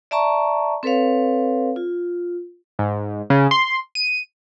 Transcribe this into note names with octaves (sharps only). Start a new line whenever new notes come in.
D5 E5 A5 A#5 C#6
C4 A4 B4 C#5 F5
F4
G#2
C#3
C6
D#7